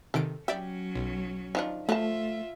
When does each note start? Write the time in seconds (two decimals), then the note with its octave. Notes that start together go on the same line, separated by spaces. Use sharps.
0.14 C3 D#3 A4 D7
0.48 F#3 C#4 G4 D5 E5
0.95 B1
1.55 D#3 F3 D4
1.89 F3 A3 F4 E5 A5 F#6